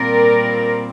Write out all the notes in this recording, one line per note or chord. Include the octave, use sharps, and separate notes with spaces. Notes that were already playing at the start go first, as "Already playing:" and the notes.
Already playing: A#2 G3 C4 A#4 D5